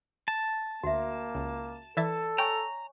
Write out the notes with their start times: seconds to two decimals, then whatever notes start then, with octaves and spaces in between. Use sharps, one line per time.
0.28 A5
0.84 D2 A#3 F#4 E5
1.35 C#2
1.97 E3 A4 D5 E5 A6
2.38 C#5 G5 G#5 A#5 C#6